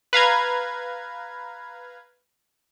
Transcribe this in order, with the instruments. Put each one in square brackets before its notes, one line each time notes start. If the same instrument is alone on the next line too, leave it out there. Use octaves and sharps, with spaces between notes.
[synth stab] B4 F5 A#5 G#6